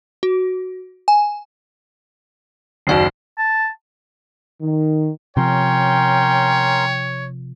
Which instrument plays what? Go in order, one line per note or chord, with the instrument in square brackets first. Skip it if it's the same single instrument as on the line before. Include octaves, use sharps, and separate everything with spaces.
[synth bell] F#4
G#5
[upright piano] F#1 D#2 [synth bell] F#4 D5 C7
[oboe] A5
[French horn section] D#3
[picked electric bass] C3 F3 [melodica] C#4 A#4 C6 [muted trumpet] C#5 [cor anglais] G5